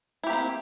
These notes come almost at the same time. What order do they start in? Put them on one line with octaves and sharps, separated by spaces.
E4 G4 A#3 C4